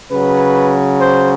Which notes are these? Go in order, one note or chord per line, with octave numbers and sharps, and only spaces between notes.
C#3 F#3 B4
C5